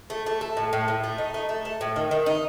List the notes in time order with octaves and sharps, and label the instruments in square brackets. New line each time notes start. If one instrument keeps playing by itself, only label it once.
[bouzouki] A3
A3
A4
A2
A2
A2
A3
D#4
A3
A3
A4
A2
D#3
D#3
D#4